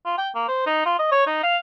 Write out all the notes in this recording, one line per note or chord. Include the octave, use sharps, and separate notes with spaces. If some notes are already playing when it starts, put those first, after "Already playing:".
F4
G5
A#3
C5
D#4
F4
D#5
C#5
D#4
F5